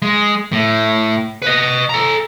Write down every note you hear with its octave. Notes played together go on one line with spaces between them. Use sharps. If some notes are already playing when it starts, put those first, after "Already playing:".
G#3
A2
B4 D#5
A4 A#5